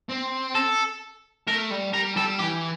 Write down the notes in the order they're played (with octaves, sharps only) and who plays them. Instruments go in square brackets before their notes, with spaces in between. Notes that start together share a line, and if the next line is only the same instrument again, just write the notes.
[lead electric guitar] C4
[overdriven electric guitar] A4
[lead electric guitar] A3 [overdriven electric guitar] A#4
[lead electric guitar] G3
[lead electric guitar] G3 [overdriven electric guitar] A#4
[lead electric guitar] G3 [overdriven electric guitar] A4
[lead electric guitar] E3 [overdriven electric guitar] G4